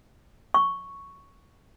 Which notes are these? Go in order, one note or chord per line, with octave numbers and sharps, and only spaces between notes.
C#6